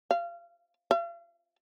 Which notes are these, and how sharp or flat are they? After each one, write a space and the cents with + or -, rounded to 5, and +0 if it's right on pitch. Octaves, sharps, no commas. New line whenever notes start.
F5 -25
F5 -40